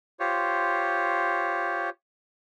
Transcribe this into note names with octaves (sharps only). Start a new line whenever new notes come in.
F4 G4 C5 C#5